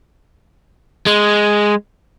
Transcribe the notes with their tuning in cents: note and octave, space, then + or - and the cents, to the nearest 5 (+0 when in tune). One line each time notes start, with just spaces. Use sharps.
G#3 +0